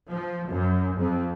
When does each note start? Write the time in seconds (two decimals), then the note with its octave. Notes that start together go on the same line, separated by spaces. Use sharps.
0.11 F3
0.50 F#2
0.98 F2